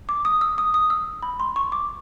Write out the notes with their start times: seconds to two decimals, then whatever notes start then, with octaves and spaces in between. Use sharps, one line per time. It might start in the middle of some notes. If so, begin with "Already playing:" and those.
0.09 D6
0.25 D#6
0.41 E6
0.58 D#6
0.74 D#6
0.90 E6
1.23 B5
1.40 C6
1.56 C#6
1.72 D6